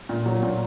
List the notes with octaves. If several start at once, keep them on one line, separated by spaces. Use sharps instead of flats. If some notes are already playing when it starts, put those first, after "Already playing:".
A#2
F#3
A#2